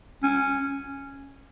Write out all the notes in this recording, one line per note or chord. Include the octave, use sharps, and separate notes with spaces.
C#4